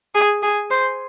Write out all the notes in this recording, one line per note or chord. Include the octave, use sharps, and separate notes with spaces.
G#4
G#4
C5